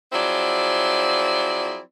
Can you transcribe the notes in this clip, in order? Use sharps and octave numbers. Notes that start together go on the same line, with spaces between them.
F3 F#3 C4 E4 G#4 D5